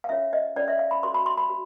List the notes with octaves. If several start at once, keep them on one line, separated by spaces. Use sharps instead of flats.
F5
C#4 F4 A4 C#5 E5
D#5
C#4 F4 A4 C#5 D5
E5
F5
B5
F#4 A4 C5 C6
B5
C6
B5
F#4